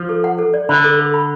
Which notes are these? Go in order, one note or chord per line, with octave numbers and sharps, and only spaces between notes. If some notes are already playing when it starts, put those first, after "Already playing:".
Already playing: F3
A4
F#5
A4
D5
D3 B5
A4
A4
B5